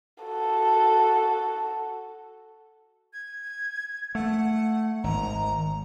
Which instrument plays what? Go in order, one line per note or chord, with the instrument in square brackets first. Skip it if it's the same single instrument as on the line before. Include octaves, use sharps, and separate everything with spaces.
[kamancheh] F#4 A4
[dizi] G#6
[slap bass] A3 [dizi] F#5
[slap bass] G#1 [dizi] A#5